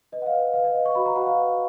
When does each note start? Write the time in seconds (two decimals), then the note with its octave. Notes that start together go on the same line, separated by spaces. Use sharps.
0.12 B4 D#5
0.22 F#5
0.26 F5
0.33 B4
0.54 B4 F5
0.64 D#5
0.75 B4
0.86 C#6
0.95 F#4 B5
1.06 A#5
1.16 F#4 F#5
1.27 F5
1.37 B4